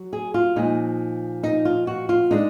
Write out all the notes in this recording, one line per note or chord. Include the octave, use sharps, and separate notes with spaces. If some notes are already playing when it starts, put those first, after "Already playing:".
Already playing: F#3
G#4
F4
A#2 F3 G#3 D#4
D#4
F4
F#4
F4
G#3 D4 D#4